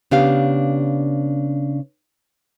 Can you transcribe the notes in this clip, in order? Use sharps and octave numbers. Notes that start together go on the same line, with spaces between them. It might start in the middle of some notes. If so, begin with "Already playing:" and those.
C#3 B3 D4 G4 F5